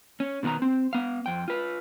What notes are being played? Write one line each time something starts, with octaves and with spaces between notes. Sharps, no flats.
C#4
B2 D#3 B3 D#4 A#5
C4
B3 F5
F2 G5
F4 B4